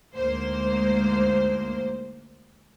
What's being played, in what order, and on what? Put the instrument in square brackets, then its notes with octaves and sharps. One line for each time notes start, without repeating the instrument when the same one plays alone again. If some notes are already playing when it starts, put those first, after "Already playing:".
[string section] D2 G#2 A#3 C5